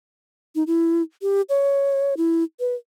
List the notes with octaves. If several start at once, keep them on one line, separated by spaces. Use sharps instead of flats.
D#4
E4
G4
C#5
E4
B4